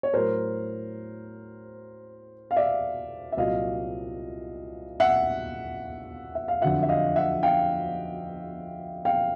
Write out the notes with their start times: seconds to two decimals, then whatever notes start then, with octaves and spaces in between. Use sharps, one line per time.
0.03 C#5
0.13 A2 F#3 A#4 C5
2.51 F5
2.56 D5 E5
3.32 E5
3.37 C2 A#2 F#3 D#5 F5
5.00 E5 F#5
6.35 E5
6.48 F5
6.62 F2 D3 F#3 E5 F#5
6.83 E5
6.89 D#5 F5
7.16 E5 F#5
7.43 F5 G5
9.05 F5 G5